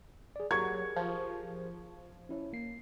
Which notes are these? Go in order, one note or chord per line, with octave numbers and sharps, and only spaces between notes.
G#4 D5
F#3 G4 G#4 A#4 C#6 G#6
F3
C#4 E4 C#5
A#3 C7